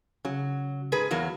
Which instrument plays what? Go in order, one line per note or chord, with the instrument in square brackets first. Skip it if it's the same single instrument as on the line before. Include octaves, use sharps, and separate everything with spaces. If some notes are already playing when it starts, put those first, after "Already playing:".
[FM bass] C#3 [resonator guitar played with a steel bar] F#3
[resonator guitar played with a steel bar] G#2 G#4 B4
E2 F#3 A#3